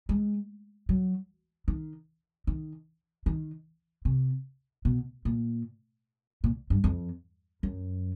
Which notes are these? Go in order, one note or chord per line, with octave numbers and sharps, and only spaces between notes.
G#3
F#3
D#3
D#3
D#3
C3
B2
A#2
A#2
G2
F2
F#2